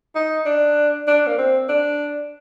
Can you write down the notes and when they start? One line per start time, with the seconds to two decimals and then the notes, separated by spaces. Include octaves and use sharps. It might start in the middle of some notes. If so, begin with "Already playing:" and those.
0.15 D#4
0.46 D4
1.07 D4
1.27 A#3
1.38 C4
1.69 D4